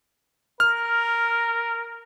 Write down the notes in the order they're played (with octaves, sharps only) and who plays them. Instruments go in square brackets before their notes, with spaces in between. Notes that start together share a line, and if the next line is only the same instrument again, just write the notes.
[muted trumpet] A#4 [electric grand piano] F6